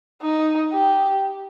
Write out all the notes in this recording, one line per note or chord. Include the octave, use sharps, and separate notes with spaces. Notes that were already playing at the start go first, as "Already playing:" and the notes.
D#4
G4